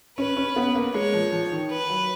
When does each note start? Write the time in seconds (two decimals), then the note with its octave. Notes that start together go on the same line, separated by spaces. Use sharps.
0.18 C#4 B4
0.37 C#4
0.56 B3
0.75 A#3
0.94 G#3 C#5
1.14 F3
1.32 F3
1.51 D#3
1.71 B4
1.90 F#3